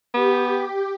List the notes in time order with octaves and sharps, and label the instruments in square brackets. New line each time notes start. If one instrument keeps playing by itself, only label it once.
[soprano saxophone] B3 [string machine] G4